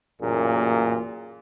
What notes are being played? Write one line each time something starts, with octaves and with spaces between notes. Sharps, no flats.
A1 F#2 A#2 A#3 G#4